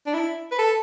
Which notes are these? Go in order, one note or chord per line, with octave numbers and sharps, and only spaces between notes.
D4
E4
B4
A4